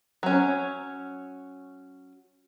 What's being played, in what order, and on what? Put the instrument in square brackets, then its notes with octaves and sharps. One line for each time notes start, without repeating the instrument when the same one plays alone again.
[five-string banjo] F#3 C#4